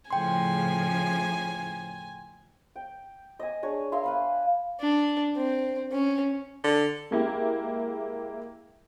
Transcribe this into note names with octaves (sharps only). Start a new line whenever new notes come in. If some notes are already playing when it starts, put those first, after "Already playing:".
A2 C#3 F3 G5 G#5 C6
G5
D#5 G#5
D4 G#4 C#5 E6
A#4 E5 F5 C6
B4 F5 B5
D4
C4
C#4
D3
G#3 A#3 E4 G4